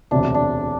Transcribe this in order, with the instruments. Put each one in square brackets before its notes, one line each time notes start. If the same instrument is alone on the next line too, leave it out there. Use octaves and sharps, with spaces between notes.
[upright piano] E1 D2 C3 [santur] D4
[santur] D4